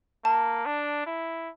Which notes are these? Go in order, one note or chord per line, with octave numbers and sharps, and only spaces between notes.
A#3 A5
D4
E4